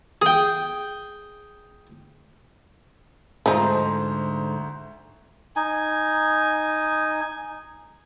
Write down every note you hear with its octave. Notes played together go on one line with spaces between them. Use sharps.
G#4 G5
D2 G#2 D3 F3 D#4 C5 A#5
D#4 G#5